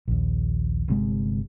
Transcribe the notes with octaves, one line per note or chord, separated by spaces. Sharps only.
A#1 D#2
G1 C3 G#3